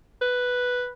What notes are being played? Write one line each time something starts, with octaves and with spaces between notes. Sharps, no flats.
B4